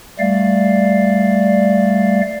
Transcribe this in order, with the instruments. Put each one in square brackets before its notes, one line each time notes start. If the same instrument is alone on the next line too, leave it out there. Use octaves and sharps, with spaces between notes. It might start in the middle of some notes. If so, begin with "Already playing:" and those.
[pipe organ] G3 A3 D5 F5